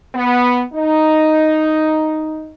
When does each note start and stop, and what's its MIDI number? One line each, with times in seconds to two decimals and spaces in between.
0.15 0.62 59
0.73 2.54 63